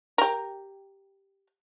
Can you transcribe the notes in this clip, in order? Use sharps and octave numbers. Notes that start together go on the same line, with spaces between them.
G4 A#4